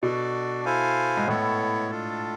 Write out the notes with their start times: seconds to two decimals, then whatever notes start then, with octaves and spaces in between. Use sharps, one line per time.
0.03 B2 D4 F#4 A4 D5
0.65 E4 A4 C5 F5 G#5
1.17 G#2
1.28 A2 B3 E4 A4 C#5
1.90 D4 F4 A4